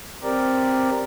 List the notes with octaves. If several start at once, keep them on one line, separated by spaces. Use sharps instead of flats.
C4 G4 A#4 D5